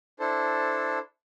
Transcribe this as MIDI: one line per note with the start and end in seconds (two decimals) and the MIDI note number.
0.20 0.99 62
0.20 0.99 64
0.20 0.99 69
0.20 0.99 72
0.20 0.99 81